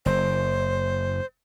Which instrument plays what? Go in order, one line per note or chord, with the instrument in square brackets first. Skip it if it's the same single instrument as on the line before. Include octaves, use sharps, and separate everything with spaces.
[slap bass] F#1 [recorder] C5